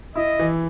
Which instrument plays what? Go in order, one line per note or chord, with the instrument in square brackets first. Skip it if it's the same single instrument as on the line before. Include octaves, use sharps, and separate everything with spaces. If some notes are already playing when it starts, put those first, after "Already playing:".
[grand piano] E4 [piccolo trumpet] D#5
[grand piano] E3